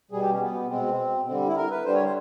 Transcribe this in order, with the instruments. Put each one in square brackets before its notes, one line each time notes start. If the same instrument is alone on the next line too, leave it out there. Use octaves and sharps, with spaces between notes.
[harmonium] B2 G3 G#4
G4
C#4
B3
B2 G#3 C4
D3 G3 C4
E4
A#4
B4
D3 G3 C5
C#5
C5